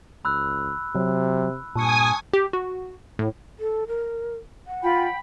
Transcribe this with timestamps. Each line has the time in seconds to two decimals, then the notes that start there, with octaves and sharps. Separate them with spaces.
0.25 C#2 B5 E6 F#6
0.95 C3 F#3
1.76 G2 A#2 G#5 A5 C#6 D#6 C#7
2.33 G4
2.53 F#4
3.19 A2
3.59 A4
3.88 A#4
4.67 F#5
4.83 F4 G5 B5